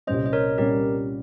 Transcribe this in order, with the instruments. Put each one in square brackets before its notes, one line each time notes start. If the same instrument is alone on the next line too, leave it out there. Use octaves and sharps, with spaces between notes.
[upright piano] C2 A#2 G3 C#4 [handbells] C5 D#5
[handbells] D#5
A#4 C#5
[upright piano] A#2 G3 C#4 [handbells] G4 A#4